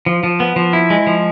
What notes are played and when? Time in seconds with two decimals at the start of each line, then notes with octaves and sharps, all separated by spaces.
0.06 F3
0.23 F3
0.40 B3
0.56 F3
0.73 E4
0.90 G#3
1.07 F3